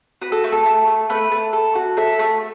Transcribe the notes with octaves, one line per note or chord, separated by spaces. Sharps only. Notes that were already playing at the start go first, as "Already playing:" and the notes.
F#4 B4
A4
A3
A4
A3
A3
A3 B4
A3
A4
F#4
A4 E5
A3